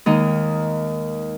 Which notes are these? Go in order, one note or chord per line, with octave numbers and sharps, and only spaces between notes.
D#2 D#3 G#3 D#4